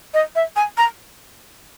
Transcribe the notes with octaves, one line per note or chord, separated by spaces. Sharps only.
D#5
E5
G#5
A#5